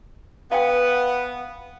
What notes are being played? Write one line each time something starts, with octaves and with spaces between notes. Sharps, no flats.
B3 F5 G5